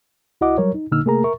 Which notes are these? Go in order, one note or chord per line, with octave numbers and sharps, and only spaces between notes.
C2 E4 F#4 D#5 F#5 D6
F#3 G3 A#4 C#5
D#4
A#2 D3 A#3 D#4 E6 F6
C3 A3 A#3 G#4 A#4 A#5
A#4 E5 C#6